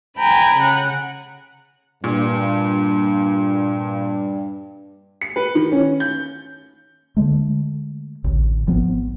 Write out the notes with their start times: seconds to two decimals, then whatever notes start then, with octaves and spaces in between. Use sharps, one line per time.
0.18 G5 G#5 A#5 B5
0.57 C#3 F#5
2.04 G2 A#2
5.21 C#7
5.36 B4
5.55 D#3
5.72 C#4
6.00 G6
7.17 D3 D#3 G#3 A3
8.24 A1 D2
8.67 G#1 F3 B3 C4